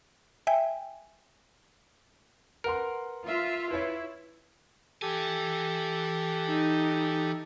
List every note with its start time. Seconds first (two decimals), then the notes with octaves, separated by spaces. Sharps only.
0.47 E5 G5 G#5
2.64 A#4 B4 F#5 C6
3.27 F4 E5
3.71 E4 B4 C#5
5.02 E3 G4 A4 G#5
6.49 D#4